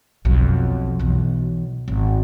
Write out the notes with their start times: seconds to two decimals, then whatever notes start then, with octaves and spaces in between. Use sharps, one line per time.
0.25 B1 F2
0.99 B1 E3
1.88 G#1